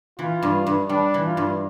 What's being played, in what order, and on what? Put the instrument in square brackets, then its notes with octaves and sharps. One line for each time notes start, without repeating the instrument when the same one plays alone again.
[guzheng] E3 [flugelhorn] F4
[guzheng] G2
G2
[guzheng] G3 [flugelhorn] D4
[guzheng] E3
[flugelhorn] F4
[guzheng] G2